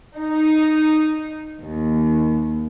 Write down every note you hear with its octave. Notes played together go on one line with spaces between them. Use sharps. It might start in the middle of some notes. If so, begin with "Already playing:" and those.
D#4
D#2